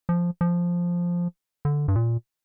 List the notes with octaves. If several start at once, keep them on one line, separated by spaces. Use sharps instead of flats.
F3
F3
D3
G2
A#2